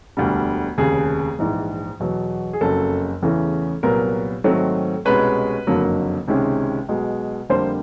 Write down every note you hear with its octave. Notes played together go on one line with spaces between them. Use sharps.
E1 D2 D3 G3
F1 D#2 C#3 G#4
A#1 G#2 E3
E2 B2 F#3
G#4
F#1 F2 C#3 F#3 A4
E2 C#3 E3 A3 C#4
C2 A#2 F#3 B3 A#4
G#2 D#3 F#3 A3 C4
C2 B2 G#3 C#4 B4
F#1 F2 D3 F#3 A#3
C#2 C3 D#3 G#3 C#4
B1 B2 G#3
F2 D3 G3 A#3 C5